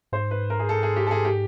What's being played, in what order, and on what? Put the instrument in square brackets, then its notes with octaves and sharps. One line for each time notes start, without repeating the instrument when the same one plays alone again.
[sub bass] G#2 [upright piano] C5
[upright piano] B4
A#4
G#4
A4
G#4
G4
A4
G#4
G4